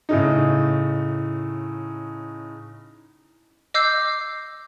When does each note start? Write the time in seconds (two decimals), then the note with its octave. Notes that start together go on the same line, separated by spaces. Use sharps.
0.09 A2 C#3 D#4
3.74 D#5 D6 E6 G6 C7